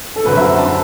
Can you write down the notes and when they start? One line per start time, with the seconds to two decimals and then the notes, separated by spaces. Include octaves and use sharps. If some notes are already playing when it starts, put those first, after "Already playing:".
0.16 A4
0.25 F#2 D3 F#3 C4 B4
0.37 E5
0.58 A5